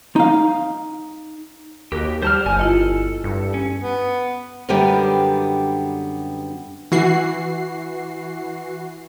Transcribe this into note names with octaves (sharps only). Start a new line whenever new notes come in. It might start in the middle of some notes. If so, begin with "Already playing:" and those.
D#4 F5
D#2 F#4 G4 A#4
G3 C5 A5 F6
G1 G#5
E4 F4 A4 D#5
G2
C#4
B3
F#2 D3 G3 B3 G4 D5
E3 F#4 C7